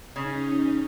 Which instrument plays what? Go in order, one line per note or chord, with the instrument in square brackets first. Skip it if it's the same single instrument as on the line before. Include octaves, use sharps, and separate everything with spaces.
[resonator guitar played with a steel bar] C#3 [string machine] C#4 D#4